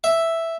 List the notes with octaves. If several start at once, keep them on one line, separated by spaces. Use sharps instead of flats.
E5